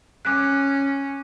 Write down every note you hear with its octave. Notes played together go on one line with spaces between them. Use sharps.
C#4 D6 F#6